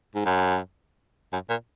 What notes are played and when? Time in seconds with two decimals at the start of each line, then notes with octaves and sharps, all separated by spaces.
0.15 G#2
0.25 F#2
1.33 F#2
1.50 A#2